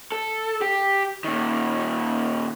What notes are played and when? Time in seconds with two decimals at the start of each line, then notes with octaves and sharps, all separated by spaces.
0.12 A4
0.62 G4
1.24 A#2 D#3